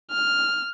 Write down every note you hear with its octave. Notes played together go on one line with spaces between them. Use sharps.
F6